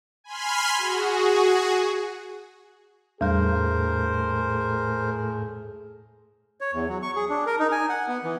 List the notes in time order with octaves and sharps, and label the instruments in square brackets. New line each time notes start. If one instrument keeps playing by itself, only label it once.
[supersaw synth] G#5 B5 C6 F6
F#4 G#4
[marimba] E2 G3 [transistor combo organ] A2 [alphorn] G#4 [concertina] A#4 C5
[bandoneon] C#5
E2
F#3
C#6
G#4
D4
A#4
D#4
G#5
F#5
B3
E3